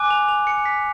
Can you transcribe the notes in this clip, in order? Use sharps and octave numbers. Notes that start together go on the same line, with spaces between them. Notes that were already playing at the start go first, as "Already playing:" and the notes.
Already playing: G#5 D6 F#6
F7
F7
C#7
B6